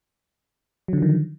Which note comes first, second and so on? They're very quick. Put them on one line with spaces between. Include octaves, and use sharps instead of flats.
F#3 D3 F3 D#3